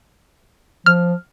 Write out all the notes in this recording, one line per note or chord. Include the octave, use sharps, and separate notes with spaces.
F3 F6